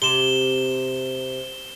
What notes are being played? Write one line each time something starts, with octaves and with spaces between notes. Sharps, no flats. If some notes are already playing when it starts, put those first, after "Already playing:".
C3 E7 G7